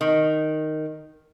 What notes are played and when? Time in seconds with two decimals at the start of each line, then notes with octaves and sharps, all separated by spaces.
0.01 D#3